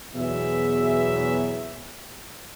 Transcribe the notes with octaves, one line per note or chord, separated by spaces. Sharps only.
E2 B2 E3 F#3 G#4 E5